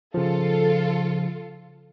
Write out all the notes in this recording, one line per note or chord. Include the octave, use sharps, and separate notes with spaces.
C#3 F3 F4 A4